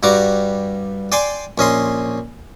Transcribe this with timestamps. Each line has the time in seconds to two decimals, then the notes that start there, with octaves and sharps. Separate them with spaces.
0.03 G2 G3 F#4 A#5 D6
1.12 D5 G5 G#5 C6 D6
1.58 A#1 C#4 D#5 C6